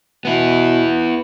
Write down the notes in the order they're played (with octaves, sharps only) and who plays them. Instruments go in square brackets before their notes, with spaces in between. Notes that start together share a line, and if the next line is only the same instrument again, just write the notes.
[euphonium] B2 [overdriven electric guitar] B3 E4